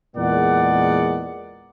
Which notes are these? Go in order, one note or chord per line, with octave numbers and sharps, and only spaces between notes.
E2 A#2 G#3 A#4 D5 F#5